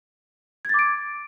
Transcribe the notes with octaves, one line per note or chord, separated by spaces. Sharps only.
D6 G#6 A6 D7